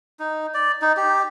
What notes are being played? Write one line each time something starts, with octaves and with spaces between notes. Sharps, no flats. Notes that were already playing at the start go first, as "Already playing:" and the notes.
D#4
D5
D#4
G4